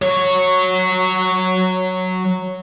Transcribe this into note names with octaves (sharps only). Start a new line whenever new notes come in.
F#3 C#5